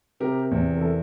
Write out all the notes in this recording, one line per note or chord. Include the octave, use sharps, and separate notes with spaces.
C3 G4 A#4
E2
A#4
E3 A4